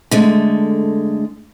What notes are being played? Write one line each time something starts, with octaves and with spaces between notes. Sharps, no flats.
D3 G#3 A3